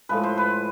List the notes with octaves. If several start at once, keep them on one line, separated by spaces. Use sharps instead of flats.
A2 F3 G#3 B4
C5
B4